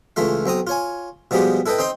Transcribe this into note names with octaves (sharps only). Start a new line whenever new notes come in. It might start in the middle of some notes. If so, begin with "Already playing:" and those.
C#2 E3 A3 F4 F5
B1 C4 A#5 D#6
F4 C#5 G#5
B2 F3 G3 G#3 B3 G4
E4 A4 B4 D#5 G5
C4 D#4 D#5 G5 C6